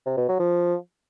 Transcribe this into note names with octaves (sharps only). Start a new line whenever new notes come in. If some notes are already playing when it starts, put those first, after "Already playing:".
C3
B2
F#3
F3